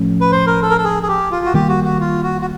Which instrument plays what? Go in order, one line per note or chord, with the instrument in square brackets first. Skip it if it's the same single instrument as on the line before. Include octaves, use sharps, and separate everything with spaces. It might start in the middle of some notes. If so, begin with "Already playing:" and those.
Already playing: [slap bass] A2 F3 A3 C#4
[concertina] B4
C5
A#4
A4
A#4
A4
G#4
G#4
G4
F4
F#4
[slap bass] D#3 G3 A#3 [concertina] G4
[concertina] F#4
F#4
F4
F#4
F#4